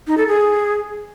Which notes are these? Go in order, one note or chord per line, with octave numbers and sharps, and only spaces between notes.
D#4
A4
G#4